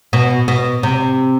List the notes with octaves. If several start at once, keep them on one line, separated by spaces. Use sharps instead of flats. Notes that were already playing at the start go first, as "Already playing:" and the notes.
B2
B2
C3